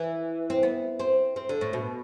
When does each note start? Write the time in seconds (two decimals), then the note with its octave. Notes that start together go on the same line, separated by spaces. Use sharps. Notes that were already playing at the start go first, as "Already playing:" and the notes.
Already playing: E3
0.50 C4
0.63 B3
0.99 C4
1.36 C4
1.49 D3
1.61 A2
1.73 B2